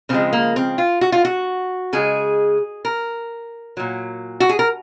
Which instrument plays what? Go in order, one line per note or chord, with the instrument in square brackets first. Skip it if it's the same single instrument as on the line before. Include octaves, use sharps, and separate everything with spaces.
[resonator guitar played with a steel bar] C#3 F3 G#3 C4
A#3
C4
F4
F#4
F4
F#4
C#3 G#3 G#4
A#4
A#2 F#3
F#4
G#4
A#4